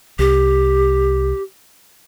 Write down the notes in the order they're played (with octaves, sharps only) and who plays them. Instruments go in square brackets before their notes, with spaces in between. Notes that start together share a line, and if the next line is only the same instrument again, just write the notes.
[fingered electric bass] C2 [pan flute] G4